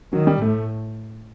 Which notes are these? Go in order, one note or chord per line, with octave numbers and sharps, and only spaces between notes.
D#3 F#3
G3
A2 A3